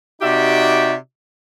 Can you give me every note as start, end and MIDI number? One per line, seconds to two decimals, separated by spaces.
0.22 0.95 48
0.22 0.95 63
0.22 0.95 66
0.22 0.95 67
0.22 0.95 74
0.22 0.95 76